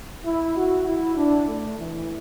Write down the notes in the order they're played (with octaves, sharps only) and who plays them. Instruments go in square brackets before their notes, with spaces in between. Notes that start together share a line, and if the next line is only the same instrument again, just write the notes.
[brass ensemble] E4
F#4
E4
D4
A3
E3